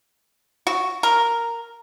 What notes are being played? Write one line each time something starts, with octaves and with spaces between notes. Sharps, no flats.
F#4
A#4